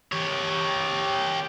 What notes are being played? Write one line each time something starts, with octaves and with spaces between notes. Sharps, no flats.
G4 C#5